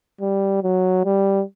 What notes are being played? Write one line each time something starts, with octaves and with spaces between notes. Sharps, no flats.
G3
F#3
G3